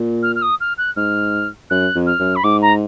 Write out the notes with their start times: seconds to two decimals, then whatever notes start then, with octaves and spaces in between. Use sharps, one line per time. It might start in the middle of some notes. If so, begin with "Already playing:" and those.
Already playing: A#2
0.23 F6
0.36 F6
0.42 D#6
0.61 F6
0.78 F#6
0.96 G#2 F6
1.70 F#2 F#6
1.95 F2
2.07 F6
2.19 F#2
2.36 B5
2.44 G#2 D6
2.62 A#5